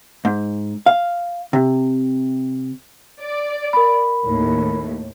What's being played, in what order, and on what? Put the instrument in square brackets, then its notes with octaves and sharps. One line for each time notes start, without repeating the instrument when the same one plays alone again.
[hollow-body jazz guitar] G#2
F5
C3
[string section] D5
[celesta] A#4 B5
[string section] D#2 A2